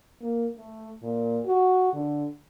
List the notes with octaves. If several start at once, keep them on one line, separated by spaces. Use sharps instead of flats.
A#3
A3
A#2
F#4
D3